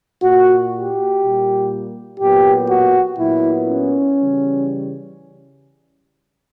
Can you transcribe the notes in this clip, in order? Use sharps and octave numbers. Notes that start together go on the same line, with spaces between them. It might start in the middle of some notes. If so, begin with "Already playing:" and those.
A#2 A#3 F#4
G4
A#2 G3 A#3
A#2 F#3 B3 G4
F#4
A#2 F#3 B3 E4
C#4
C#3 E3 G3